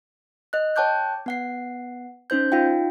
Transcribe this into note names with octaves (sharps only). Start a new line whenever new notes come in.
D#5 F#6
C#5 G5 A5 D6 F#6 G6
B3 F#5 C7
C#4 D#4 C5 G6
D#4 F4 F5 G5